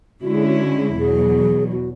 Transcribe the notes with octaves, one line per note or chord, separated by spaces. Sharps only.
D3 G#3 C#4 E4 F#4
G#4
F#4
F#4
G#4
E2 B2 F#3 G#4
F#4